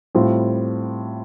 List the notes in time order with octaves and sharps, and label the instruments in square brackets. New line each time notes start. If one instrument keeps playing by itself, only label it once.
[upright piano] A2 G3 C4 F4